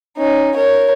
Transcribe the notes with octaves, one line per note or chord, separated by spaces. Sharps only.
C#4 D#4
A#4 C#5